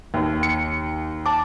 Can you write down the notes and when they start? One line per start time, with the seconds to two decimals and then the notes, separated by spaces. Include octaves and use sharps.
0.14 D#2
0.43 C#7
1.26 A5 D6